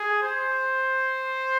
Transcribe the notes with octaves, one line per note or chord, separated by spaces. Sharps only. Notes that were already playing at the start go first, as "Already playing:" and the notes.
Already playing: G#4
C5